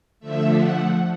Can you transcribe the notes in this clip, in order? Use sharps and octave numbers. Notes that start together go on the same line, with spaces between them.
D3 F3 A3 E5
F#5